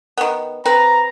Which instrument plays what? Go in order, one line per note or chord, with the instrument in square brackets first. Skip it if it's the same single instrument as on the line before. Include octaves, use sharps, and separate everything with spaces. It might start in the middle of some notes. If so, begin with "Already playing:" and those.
[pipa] D#3 B3
[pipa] C4 B4 [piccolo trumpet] A#5